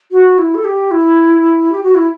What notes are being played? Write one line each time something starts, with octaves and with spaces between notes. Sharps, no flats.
F#4
E4
A4
G4
E4
G4
F#4
E4